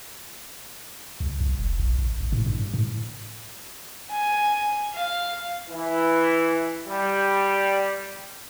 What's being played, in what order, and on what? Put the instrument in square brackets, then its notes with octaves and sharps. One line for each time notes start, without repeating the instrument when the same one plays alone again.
[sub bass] C#2
C2
E1
A#1
A1
G#1
A2
G2
A2
[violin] G#5
F5
[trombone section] E3
G3